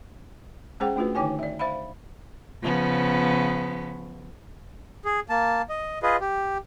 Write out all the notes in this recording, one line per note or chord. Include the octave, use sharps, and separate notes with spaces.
G#3 C#4 G#4 C5 F#5 G5
A3 D4 F4 F#4 B4
D3 D#3 D#4 C#5 G5 G#5
D5 E5
C5 E5 F5 B5
C#3 F3 B3
G#4
A#3 A5
D#5
F4 G#4 B4 D#5
G4